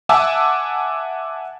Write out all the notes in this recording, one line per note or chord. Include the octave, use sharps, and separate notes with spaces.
E5 F#5 G#5 A5 D6 E6